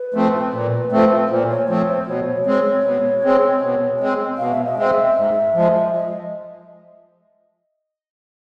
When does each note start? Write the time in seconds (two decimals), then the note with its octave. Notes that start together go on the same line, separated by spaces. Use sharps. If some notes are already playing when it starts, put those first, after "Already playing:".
Already playing: B4
0.14 F3 A3 C4
0.54 A#2
0.92 F3 A3 C4
1.30 A#2 C5
1.50 C#5
1.68 F3 A3 C4 C#5
1.88 C5
2.07 B2 C#5
2.46 G#3 C4
2.84 B2
3.23 G#3 C4
3.62 B2
4.00 G#3 C4
4.38 B2 F5
4.52 E5
4.65 D#5
4.77 G#3 C4 E5
5.16 G#2
5.54 F3 G#3
5.93 D#5